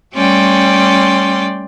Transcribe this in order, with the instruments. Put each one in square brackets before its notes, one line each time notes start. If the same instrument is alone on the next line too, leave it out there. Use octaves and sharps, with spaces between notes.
[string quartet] G3 A3 C#4 D5 G5 C6